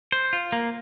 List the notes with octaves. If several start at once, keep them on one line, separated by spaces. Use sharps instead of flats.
C5
F4
A#3